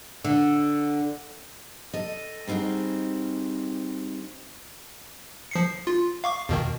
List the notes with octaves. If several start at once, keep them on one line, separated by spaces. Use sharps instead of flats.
D3
A4 D#5
G3 C4 D#4 F#4 G#4
F3 C7 C#7
F4
F5 C#6 D6
E2 B2 D#3